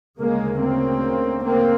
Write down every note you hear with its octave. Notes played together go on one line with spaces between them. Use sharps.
D2 C#3 G#3 A#3
A#3 C4
A#3 C4